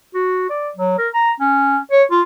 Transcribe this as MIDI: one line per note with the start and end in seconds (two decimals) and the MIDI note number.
0.15 0.46 66
0.50 0.70 74
0.77 0.97 54
0.98 1.08 70
1.14 1.31 82
1.40 1.78 61
1.92 2.03 73
2.11 2.22 65